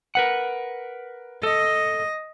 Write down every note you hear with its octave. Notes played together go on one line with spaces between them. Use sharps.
A#4 B4 F#5
A4 D#5